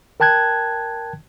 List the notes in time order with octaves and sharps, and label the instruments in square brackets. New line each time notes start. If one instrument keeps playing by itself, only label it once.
[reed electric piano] A#4 G5 A5 F#6 G#6